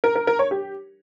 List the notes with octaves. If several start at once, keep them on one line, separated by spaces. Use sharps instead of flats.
A#4
A#4
A#4
C#5
G4